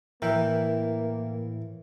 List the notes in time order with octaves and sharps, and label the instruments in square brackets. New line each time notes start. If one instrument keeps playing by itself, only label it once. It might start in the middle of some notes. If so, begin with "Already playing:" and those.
[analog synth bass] A2 [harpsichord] E3 [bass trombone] A#3 [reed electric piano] A#4 E5 G5